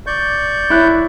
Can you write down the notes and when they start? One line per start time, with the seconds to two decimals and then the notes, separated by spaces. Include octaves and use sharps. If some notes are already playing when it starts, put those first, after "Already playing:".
0.07 D5 C#6 G6
0.70 E4 F#6